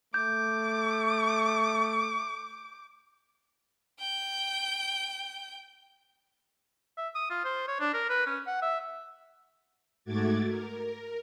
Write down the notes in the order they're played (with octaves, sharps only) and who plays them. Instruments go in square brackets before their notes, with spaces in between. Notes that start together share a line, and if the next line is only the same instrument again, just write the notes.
[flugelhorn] A3 [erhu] D6 [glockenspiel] G6
[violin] G5 G6
[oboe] E5
D#6
F4
C5
C#5
D4
A#4
B4
C#4
F#5
E5
[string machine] G#2 A3 F#4 D6 G#6 A6
A#4